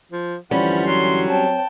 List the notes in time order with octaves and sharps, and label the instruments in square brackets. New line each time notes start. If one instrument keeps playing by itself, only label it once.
[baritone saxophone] F3
[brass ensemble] F#2 D3 E3 [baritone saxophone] F3 [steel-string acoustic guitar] G3 C#4 [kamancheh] F#5 B5
[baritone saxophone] F#3 [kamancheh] C6
[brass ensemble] C4 C#5 [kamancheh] G5 A5